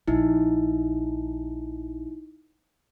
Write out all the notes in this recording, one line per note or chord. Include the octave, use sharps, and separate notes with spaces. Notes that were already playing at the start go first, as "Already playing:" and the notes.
A#1 D#4 E4